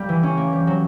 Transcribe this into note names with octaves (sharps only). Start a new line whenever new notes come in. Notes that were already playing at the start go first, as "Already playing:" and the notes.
Already playing: G3 A#3
E3
C#4
A#3
G3
F#3